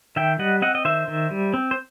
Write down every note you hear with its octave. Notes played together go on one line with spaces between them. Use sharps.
D#3 E5 G5
G3 D#5 F#5
C4 D#5 F#5
D#5
D#3 C5 E5
D#3
G3
C4
C5